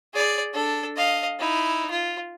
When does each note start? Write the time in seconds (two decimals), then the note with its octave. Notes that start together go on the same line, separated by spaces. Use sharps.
0.13 G#4 D5
0.53 D4 A4
0.96 D#5 F5
1.39 D#4 E4
1.91 F4